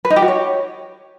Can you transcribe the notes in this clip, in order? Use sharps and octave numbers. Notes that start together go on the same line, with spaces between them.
B4
D#4
G4
F#4
C#5